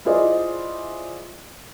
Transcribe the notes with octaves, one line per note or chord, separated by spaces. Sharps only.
E4 F4 G#4 C5 D5 D#5